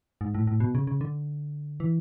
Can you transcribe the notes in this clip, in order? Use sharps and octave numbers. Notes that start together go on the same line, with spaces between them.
G#2
A2
A2
B2
C#3
C#3
D3
E3